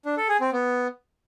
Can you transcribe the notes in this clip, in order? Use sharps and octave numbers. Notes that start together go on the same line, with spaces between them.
D4
A4
G#4
C4
B3